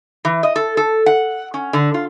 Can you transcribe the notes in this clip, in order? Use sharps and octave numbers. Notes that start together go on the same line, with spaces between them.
E3
D#5
A4
A4
F#5
C#4
D3
F4